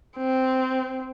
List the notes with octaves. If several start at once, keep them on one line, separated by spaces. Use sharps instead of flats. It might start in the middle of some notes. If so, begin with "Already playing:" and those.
C4